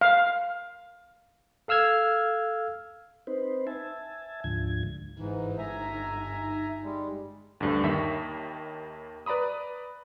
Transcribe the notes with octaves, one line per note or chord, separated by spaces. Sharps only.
F5
A4 F5 E6 F6 G#6
C4 D#4 B4 C5
E5 G#5 A5
D2 G#2 D3 F3 G#6
G1 G#2 E3 D#4
E5 G#5 A#5
D#4
G3 G#3
D2 G2 D3
D#2 D#3 E5 C#6 B6
B4 D5 A#5 B5 D#6